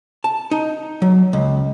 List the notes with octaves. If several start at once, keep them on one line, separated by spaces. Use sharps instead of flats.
A5
D#4
F#3
C#2